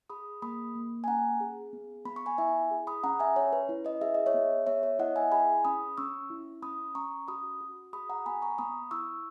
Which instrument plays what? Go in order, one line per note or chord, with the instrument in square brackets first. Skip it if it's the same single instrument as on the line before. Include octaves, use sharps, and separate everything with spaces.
[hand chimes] G#4 B5 D#6
A#3 B5 D#6
A#3
G#5
C#4 F#5 A#5
G#4
B3
B3 B5
C#6
G#5 B5
E4 E5 G#5
G#4
B5 D#6
C#4 F#5 A#5
E5 G#5
C#4 C#5
B4
E4
B4 D#5
G#4 E5
D#5
C#5 E5
B3
B3 C#5 E5
C#5
E4 D#5 F#5
E5 G#5
G#4 G#5 B5
C#4 B5 D#6
C#4 C#6 E6
E4
C#4 B5 D#6
C#4 A#5 C#6
F#4 B5 D#6
F#4
G#4 B5 D#6
F#5 A#5
B3 G#5 B5
A#5 C#6
B3 B5 D#6
E4 C#6 E6